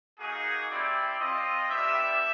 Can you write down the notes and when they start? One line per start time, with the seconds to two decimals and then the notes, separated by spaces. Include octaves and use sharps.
0.19 A#3 D#4 F#4 G#4
0.70 C4 E4 G4 D5
1.19 C4 F4 D#5
1.69 G3 B3 D4 G4 E5